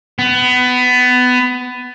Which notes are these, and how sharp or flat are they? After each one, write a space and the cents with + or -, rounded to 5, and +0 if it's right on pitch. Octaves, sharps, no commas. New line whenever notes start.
B3 +20